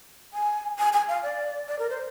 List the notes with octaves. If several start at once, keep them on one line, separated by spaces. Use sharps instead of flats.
G#5
G#5
G#5
F5
D5
D5
A#4
C5